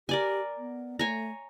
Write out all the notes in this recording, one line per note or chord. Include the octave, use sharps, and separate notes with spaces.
G4 A#4 D5 G#5
B3
A3 C#5 G#5 A#5